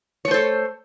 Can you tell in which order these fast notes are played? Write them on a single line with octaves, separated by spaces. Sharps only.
C#5 A3 C5 A4